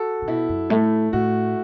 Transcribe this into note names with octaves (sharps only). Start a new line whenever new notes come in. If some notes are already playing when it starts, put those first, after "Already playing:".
Already playing: F#4 A4
D3
B2 E4
F#2
A2 A3
A2 F#4